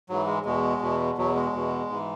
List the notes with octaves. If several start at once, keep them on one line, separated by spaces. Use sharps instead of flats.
G#2 E3 F#3
G#3
E2 B2 G#3
E2 B2
E2 B2 F#3
G#3
E2 B2
G#2 E3